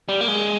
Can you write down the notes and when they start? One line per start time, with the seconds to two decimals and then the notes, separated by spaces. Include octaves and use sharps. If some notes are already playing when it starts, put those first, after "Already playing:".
0.09 G3
0.21 A#3
0.28 G#3